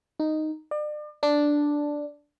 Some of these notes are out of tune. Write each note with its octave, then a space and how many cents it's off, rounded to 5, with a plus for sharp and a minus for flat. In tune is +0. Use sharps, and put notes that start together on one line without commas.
D#4 -5
D5 +35
D4 +0